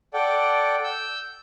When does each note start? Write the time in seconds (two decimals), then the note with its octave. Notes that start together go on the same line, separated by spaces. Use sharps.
0.14 A4 D5 F#5 G5
0.84 E6 G6